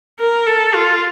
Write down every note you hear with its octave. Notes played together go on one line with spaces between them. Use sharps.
A#4
A4
F4